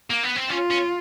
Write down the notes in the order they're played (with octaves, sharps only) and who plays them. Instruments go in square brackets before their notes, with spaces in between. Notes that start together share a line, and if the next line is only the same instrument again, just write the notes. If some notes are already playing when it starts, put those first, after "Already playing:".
[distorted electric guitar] A#3
B3
C4
[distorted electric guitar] C#4 [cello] F4
[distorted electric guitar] C#4